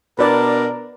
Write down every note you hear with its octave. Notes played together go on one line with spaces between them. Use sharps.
B2 D4 A#4 B4 D5